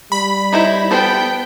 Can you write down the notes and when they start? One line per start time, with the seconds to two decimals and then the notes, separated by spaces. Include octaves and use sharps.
0.12 G3 B5
0.52 D#4 E4 C5
0.91 B3 A4 C5 G5